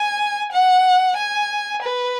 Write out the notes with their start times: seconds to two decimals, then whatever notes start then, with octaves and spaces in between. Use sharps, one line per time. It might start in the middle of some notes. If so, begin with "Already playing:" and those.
Already playing: G#5
0.52 F#5
1.17 G#5
1.82 B4